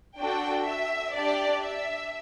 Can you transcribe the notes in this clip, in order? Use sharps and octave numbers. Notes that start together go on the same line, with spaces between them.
D4 F#4 A4 G5
E5
D4 G4 D5
E5